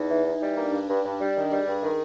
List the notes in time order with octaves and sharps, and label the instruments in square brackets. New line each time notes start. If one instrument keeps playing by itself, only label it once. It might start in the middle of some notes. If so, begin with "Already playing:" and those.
Already playing: [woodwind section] E2 [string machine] D#4
[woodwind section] E3
E3
G3
[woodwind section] A#3 [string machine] D4
[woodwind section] G2
G2
[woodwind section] G2 [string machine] D4
[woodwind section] G3
D#3
[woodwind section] G3 [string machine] G#4
[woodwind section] G2
D#3